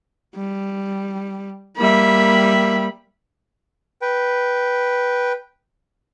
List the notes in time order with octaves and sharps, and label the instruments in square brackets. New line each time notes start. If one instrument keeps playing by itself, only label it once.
[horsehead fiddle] G3
[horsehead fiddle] G3 B5 [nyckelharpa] A#3 E5
[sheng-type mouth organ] B4 G5